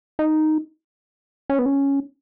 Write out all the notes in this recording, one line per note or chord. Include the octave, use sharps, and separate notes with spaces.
D#4
C#4
B3
C#4